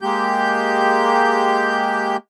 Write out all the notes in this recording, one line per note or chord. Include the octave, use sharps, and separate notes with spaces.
G#3 A#3 G4 G6